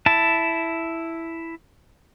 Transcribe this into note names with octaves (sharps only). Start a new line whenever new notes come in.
E4 A5